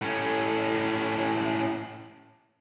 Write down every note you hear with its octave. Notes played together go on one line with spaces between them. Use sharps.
A2 C#4